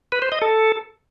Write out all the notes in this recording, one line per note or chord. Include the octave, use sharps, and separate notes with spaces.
B4
C5
D#5
A4